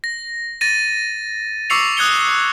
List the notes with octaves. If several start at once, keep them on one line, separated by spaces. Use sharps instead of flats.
A#6
A6 A#6 D#7
C#6 D6 E6 C7 C#7 F7
D#6 F#6 G#6 C#7 G7